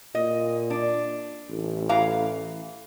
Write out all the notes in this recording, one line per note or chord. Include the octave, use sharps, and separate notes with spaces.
A#2 D#5
D4
A1
E3 F5 A#5